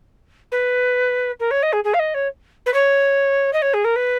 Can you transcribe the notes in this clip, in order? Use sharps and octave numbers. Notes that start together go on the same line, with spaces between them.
B4
A#4
C#5
D#5
G#4
G#4
F5
D#5
C#5
B4
C#5
D#5
C#5
G#4
A#4
B4